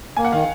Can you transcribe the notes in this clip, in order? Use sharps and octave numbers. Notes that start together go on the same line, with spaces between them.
A#3 G#5
F#5
D#3 F5